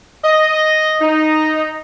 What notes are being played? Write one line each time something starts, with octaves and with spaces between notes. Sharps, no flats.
D#5
D#4